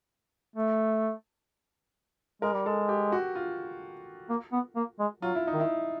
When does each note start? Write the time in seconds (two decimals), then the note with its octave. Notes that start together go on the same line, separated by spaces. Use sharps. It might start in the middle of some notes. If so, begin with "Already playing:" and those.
0.56 A3
2.42 G#3 A#4
2.54 G3
2.66 G#3 A4
2.89 G4
3.12 F#4
3.35 F4
4.29 A#3
4.52 B3
4.76 A#3
4.99 G#3
5.22 F#3 F4
5.35 E4
5.47 D#4
5.53 D#3
5.60 E4